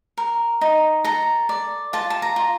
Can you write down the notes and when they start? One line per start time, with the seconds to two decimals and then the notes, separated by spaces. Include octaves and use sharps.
0.18 A#4
0.61 D#4
1.04 A4 A#5
1.49 D5
1.93 F4 A5
2.10 A5
2.22 A#5
2.36 F4